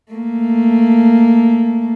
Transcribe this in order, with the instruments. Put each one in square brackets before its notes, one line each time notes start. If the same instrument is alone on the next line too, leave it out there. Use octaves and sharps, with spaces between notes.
[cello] A3 A#3